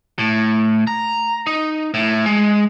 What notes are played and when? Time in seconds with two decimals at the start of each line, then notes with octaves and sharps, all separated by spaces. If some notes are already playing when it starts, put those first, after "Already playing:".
0.19 A2
0.87 A#5
1.47 D#4
1.94 A2
2.26 G#3